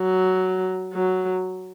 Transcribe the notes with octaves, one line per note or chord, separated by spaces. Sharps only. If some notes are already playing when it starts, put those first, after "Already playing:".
Already playing: F#3
F#3